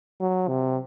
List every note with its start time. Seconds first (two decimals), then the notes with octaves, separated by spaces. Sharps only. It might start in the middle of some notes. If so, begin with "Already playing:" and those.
0.20 F#3
0.48 C3